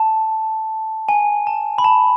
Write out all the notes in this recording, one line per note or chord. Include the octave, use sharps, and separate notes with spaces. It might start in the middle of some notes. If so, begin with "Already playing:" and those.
Already playing: A5
G#5
A5
B5
A5